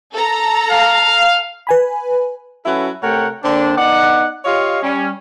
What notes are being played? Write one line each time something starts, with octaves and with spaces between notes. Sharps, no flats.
A4 A#5
F5
B4 G#5 B5
F#3 C#4 E4 F#4 A4 B4
C3 A3 A#4 C#5 F#5 G5
D3 A#3 C4 D4
B3 D#4 D5 F#5
F4 G4 C#5 D#5 F5
G3 C#4